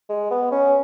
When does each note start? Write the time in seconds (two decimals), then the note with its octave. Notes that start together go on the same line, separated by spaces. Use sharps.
0.09 G#3
0.31 B3
0.52 C#4